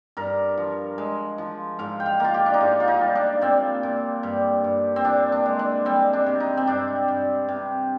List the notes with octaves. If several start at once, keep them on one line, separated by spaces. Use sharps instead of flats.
G2 A#4
F3
G#3
F3
G#2 F5
G5
F5
A#3 F4
G4
D4
D#4
G#2 F4
F4
D#4
G3
D4
A#2 C4
A#2
G2
G2
C4
A#2 D4
D4
G#3
D4
G3 C4
D4
C3
D#4
C4
G2 D4
G2
C3